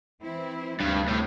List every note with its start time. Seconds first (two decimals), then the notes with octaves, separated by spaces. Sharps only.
0.23 E3 C4 E4
0.79 D2 G2 C3 G3
1.08 A2